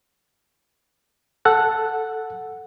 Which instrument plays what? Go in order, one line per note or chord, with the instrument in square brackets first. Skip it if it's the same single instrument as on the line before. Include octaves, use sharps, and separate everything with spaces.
[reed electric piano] A4 F#5 A5